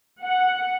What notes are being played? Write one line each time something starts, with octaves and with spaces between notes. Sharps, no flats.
F#5